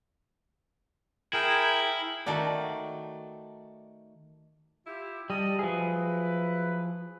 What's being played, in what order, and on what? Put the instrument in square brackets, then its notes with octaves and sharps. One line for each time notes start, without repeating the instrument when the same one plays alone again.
[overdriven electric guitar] E4 [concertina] G#4 A#4 G5
[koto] D#3 A3 F#4 D5
[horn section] E4 F4 G4
[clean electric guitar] G3 [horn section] D#5 A5
[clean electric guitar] F3 G#4 [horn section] F#3 E4 B4